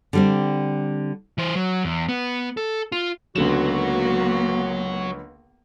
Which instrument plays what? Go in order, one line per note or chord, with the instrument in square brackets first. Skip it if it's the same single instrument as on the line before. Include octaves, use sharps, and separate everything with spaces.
[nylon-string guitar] D3 G3 C4
[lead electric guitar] E3 C5
F#3
E2
B3
A4
F4
[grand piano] C#2 D3 E7 [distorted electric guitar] F#3 [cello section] A#3 B3 [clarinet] F#4